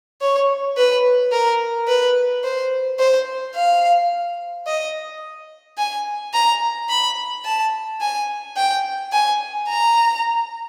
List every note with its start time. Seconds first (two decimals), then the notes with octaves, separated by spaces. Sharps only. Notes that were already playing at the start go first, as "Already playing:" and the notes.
0.21 C#5
0.77 B4
1.32 A#4
1.88 B4
2.44 C5
2.99 C5
3.55 F5
4.67 D#5
5.78 G#5
6.34 A#5
6.89 B5
7.45 A5
8.01 G#5
8.57 G5
9.12 G#5
9.68 A#5